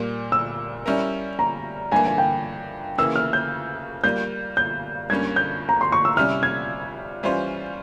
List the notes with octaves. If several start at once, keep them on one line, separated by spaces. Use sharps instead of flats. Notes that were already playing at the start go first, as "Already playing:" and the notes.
Already playing: A#2 G3 A#3
E6
G3 C#4 E4 A#4
A#5
G2 E3 A#3 G#5
G#5
G5
C#3 E3 A#3 E4 E6
F6
G6
G3 A#3 F4 G6
G6
G2 G3 A#3 C#4 G#6
G6
A#5
C6
C#6
E6
C3 G3 C#4 E4 F6
G#6
E3 G3 C#4 F4 C5